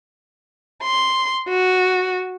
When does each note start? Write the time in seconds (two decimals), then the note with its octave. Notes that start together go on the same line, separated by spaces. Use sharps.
0.83 C6
1.49 F#4